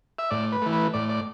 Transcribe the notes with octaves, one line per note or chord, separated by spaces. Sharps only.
E5
A2 D5
B4
E3 A3
B4
A2 D5
D5